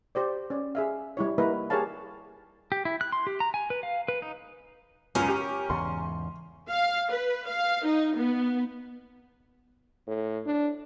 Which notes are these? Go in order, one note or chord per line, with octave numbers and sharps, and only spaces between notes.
G4 C5 D5
C#4 D5
G#4 E5 F5
G3 E4 C#5
G3 A#3 E4 B4 D#5 A#5
G4 G#4 A#4 C#5 F5 A5
G4
E4
F#6
C6
G4
A#5
G#5
B4
F5
B4
D#4
C#2 F#2 C#4 A#4
G4
E2 G#2 C#3 C6
F5
B4
F5
D#4
B3
A2
D4